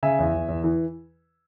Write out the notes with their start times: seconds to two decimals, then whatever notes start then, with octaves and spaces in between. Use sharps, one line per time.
0.03 C#3 E5 G#5
0.19 E2
0.34 E2
0.49 E2
0.64 E3